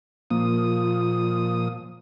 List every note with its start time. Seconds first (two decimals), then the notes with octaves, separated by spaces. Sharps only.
0.31 A#2 F3 A#3 D#6